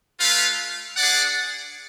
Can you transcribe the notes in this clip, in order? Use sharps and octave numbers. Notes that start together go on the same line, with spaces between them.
A3 F4 B4 F5
D4 G#4 D5 F#5